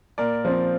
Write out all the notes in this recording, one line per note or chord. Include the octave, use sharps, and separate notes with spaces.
A#2 A#4 D5
F3 C4